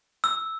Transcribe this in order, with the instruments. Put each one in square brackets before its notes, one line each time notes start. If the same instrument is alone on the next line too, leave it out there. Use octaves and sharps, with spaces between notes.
[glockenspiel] E6